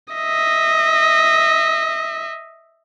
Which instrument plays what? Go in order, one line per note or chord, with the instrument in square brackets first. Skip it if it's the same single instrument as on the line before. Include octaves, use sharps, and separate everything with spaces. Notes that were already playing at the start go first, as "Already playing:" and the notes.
[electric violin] D#5 E5